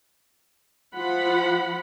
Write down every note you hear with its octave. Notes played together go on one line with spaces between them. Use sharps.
F3 F4 F#5 B5